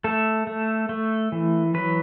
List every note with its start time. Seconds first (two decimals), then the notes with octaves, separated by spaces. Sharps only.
0.04 A3 A4
0.47 A3
0.89 A3
1.32 E3
1.74 F#3 B4